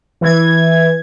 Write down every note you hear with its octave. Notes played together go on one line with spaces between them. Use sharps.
E3 G#6